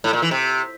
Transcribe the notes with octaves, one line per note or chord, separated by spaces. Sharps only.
A2
A#2
E3
C3